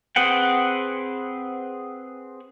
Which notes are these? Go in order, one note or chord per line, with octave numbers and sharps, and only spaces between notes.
C4 G#4 B4 F#5 G5